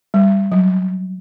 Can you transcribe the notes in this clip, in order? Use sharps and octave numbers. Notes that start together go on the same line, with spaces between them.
G3
F#3